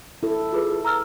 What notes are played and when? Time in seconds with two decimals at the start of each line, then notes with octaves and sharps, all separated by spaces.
0.23 E4 A4
0.52 F4 G#4 B4
0.85 A#5 E6 F6